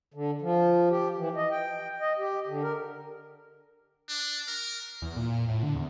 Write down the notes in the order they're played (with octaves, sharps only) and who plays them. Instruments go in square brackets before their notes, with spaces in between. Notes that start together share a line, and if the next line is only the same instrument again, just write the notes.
[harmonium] D3
F3
G4
E3
D#5
G5
D#5
G4
D3
A#4
[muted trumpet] D4
A#4
[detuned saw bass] E2
A#2
A2
D3
E2